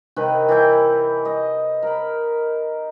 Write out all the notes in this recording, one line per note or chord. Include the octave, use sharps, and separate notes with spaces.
C3 D#3 G#4 B4
E3 E4 G5
D#5
A#4 B5